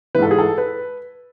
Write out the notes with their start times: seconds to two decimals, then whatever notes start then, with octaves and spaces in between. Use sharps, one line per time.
0.15 E3 B4
0.18 G#2 A4
0.31 G#4
0.38 A4
0.58 B4